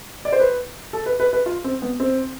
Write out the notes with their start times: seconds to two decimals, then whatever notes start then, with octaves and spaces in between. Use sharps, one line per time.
0.25 D5
0.32 C5
0.40 B4
0.93 A4
1.06 B4
1.20 B4
1.33 B4
1.46 F4
1.64 C4
1.82 B3
2.00 C4